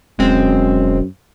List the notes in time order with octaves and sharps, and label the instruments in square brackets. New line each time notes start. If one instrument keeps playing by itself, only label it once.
[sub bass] E1 [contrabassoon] F#2 [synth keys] G#3 C4